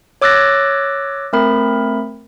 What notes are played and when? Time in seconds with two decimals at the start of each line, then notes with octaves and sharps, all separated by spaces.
0.22 C#5 D6 E6 F#6 A6 A#6
1.33 A3 C4 A#4 B5